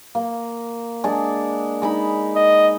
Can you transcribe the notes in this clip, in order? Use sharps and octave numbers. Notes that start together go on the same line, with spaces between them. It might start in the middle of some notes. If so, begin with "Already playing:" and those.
A#3
G#3 D4
G#3 D#4 B5
D#5